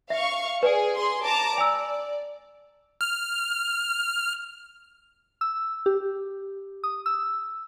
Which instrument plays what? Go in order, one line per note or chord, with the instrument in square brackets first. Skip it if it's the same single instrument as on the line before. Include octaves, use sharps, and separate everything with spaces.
[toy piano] E5 [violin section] F5 C#6
[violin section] G#4 [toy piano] B4 D5 G#5
[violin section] G#4 C6
A5 A#5 D6
[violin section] D5 [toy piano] G#5 E6
[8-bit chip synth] F6
[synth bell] E6
G4
D#6
E6